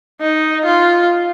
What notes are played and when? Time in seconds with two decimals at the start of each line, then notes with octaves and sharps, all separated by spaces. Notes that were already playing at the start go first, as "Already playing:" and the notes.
0.20 D#4
0.65 F4